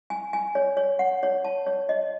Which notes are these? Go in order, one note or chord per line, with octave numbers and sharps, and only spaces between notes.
G#5
G#5
C#5
C#5
F#5
C#5
A5
C#5
D#5